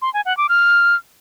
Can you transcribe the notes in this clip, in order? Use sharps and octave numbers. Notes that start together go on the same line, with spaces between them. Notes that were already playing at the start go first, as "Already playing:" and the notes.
C6
G#5
F#5
D6
F6